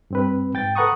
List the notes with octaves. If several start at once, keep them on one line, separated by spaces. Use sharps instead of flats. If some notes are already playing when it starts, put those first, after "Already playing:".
G2 C4 B4
G#2 G5 A6
A4 B4 F#5 A#5 C#6 D#6